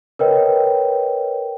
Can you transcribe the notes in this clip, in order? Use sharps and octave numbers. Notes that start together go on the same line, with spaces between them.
A#4 B4 C#5 D#5 G5